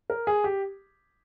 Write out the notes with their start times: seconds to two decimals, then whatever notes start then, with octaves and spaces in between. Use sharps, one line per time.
0.10 A#4
0.27 G#4
0.44 G4